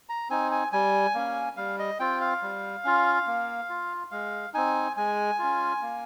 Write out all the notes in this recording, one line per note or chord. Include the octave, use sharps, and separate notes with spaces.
A#5
C4 D#4 G#5
G#5
G3 G#5
A#3 C#4
G3 F5
D#5
C4 F4 G5
F5
G3
C#4 F4
A#3
F4
G#3 F5
C4 D#4 G#5
G#3 G#5
C#4 F4
A#3